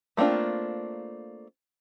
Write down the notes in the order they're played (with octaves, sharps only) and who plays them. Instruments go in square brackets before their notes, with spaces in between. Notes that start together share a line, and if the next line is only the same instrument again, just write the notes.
[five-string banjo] A3 A#3 C4 D4 F4